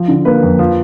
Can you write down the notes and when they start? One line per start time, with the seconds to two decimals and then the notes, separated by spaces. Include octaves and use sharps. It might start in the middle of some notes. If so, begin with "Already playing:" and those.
Already playing: F3
0.08 D3
0.25 A#3 B4
0.43 F2
0.59 F3